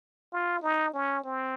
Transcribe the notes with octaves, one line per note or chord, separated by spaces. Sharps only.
F4
D#4
C#4
C4